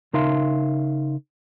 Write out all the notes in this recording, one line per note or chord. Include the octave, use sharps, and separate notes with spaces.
C#3 D#4 A#4 E5 F5 C6